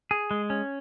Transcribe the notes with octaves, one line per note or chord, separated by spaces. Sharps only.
G#4
G#3
C#4